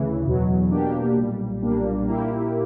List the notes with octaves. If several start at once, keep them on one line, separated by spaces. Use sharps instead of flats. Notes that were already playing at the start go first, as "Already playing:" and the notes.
Already playing: D2 C#3 E3
E2 B2 F#3
B2 A#3 D4 G4
B1 A#2 G3
B1 A#2 G3 A#3 D4
A#2 A#3 E4 G4